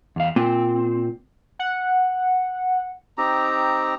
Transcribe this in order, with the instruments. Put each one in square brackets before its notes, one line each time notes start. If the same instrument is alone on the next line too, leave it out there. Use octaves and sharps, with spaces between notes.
[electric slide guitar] E2 F5
[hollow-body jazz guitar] A#2 [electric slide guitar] C4
[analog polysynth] F#5
[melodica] C4 D#4 G4 A#5